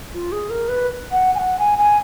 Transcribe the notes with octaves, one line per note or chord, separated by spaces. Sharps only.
F4
G#4
A#4
B4
F#5
G#5
F#5
G#5
G#5